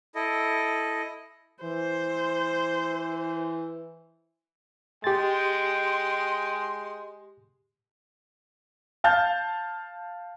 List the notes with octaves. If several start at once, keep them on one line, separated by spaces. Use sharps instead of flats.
E4 A4 D#5
E3 C5
G#3 G4 G5 C6 A6
F5 A5 F6 G6